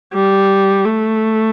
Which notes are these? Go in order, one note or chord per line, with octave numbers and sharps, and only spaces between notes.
G3
A3